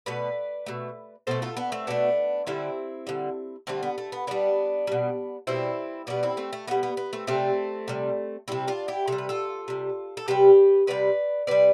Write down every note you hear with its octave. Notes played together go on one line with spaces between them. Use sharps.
B2 A3 B4 D5
B2 A3
B2 A3 A4 C5
F4 A4
B3 D4
A3 C4
B2 A3 B3 D4
D3 G3 C4 E4
D3 G3
D3 G3 A3 C4
B3
A3
B3
D3 G3 B3 D4
B2 G3
B2 G3 C4 E4
B2 G3 B3 D4
C4 E4
A3 C4
A3
B2 G3 B3
B3
B3
A3 C4
C3 G3 A3 C4
C3 G3
C3 G3 C4 E4
D4 F4
E4 G4
C3 G3 A4
B4
F4 A4
C3 G3
A4
C3 G3 G4 B4
C3 G3 B4 D5
C3 G3 B4 D5